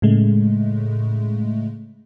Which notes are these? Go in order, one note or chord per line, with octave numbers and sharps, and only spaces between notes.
A2 C#3 G#3 A3